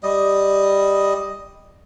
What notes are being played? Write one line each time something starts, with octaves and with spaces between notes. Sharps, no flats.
G3 D#5